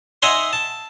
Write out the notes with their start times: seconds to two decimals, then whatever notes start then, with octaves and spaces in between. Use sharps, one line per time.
0.22 D#4 E5 F#5 G#5 A#5 C6
0.53 A5